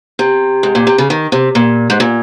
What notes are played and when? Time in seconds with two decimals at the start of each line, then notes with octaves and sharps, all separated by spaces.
0.19 C3
0.63 G#2
0.75 A#2
0.87 C3
0.98 C#3
1.10 D#3
1.32 C3
1.55 A#2
1.90 G#2
2.00 A#2